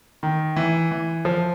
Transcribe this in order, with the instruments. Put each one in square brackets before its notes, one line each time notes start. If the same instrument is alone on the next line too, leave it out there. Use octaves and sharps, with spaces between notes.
[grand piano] D#3
E3
E3
F3